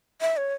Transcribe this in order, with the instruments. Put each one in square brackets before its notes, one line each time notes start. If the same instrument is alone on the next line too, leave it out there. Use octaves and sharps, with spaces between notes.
[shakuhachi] E5
C#5